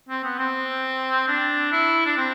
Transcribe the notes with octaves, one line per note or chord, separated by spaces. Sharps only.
C4
B3
C4
D4
E4
D4
C4